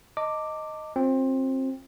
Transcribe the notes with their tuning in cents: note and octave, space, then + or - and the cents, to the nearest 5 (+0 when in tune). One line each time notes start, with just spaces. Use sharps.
D#5 +0 A5 +45 D6 +0
C4 +20 F4 +35